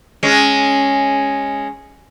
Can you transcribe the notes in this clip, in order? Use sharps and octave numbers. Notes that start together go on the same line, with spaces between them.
G#3 C#4